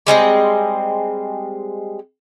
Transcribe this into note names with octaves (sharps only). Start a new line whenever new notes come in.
G3 G#3 C4 D#5